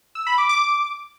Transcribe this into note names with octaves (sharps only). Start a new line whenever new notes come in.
E6
B5
D6
D6